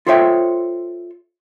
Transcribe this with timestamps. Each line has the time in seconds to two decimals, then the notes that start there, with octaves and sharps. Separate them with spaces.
0.07 F4 A4 C5 C#5 E5 G5